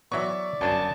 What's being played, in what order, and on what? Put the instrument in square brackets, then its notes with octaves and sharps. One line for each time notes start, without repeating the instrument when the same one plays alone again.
[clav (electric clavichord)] E3 F#3 B3 [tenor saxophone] D5 [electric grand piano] E5 C#6
[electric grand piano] G1 [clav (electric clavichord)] F#2 D4 G#5 [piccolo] A5